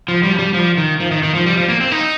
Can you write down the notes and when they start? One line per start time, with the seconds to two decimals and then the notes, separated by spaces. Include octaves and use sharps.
0.08 F3
0.23 G3
0.33 F3
0.39 G3
0.54 F3
0.77 D#3
1.00 F3
1.11 D#3
1.23 D#3
1.35 F3
1.46 G3
1.57 F3
1.68 A#3
1.81 C4
1.91 D#4